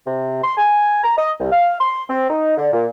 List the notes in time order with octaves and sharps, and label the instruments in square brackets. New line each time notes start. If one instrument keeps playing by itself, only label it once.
[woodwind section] C3
C6
G#5
A#5
D#5
C2
F5
C6
C4
D#4
D3
A#2